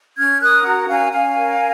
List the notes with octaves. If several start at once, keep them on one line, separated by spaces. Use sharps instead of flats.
C#4 F6 G#6
A#4 D#6 F#6
F#4 F#5 A#5
C#4 F5 G#5
C#4 F5 G#5
A#4